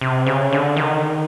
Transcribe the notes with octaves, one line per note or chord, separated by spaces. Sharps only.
C3
C#3
D3
D#3